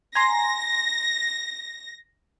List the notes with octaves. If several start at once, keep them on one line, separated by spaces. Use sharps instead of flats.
G#5 A#5 C6 A#6